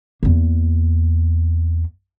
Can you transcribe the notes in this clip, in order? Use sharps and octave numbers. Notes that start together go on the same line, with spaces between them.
E2 A#3